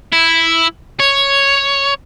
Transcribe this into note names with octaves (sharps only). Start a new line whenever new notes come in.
E4
C#5